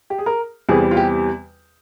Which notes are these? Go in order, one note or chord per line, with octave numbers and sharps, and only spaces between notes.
G4
G#4
A#4
E2 C3 E3 G3 G#4
F4
G4